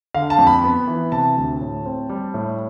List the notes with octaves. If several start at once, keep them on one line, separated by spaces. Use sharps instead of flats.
D3 F5
A5
F2
B5
B3
E3
C3 A5
D2
A2
C4
G3
A2